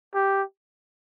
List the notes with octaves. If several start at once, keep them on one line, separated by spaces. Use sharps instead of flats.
G4